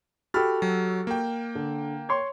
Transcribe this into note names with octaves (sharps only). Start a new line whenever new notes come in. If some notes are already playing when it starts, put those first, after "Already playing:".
F#4 G4 A4 B5 F6 A6
F#3
A#3 G5
D3
C#5 C6